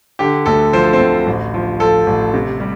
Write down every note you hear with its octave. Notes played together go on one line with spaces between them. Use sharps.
D3 G4
D2 A4
F3 C5
A4
C4 C5
D2
A1
F3
F3 A4
A1
C3
G3